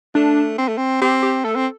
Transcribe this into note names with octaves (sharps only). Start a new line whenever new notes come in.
A3 D4
C4
A3
C4
C4 G4
G4
A3 A4
C4